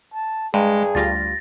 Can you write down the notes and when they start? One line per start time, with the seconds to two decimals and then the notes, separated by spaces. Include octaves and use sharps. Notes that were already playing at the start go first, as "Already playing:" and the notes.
0.14 A5
0.54 G2 G#3 G#4
0.95 D2 G3 F4 A6 A#6